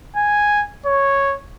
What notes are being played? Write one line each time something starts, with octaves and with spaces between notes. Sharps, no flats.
G#5
C#5